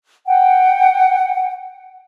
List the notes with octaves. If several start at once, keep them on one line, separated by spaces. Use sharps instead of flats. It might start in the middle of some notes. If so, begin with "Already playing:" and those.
F#5 G5